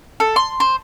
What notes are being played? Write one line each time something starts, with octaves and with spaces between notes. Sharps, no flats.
A4
C6
C5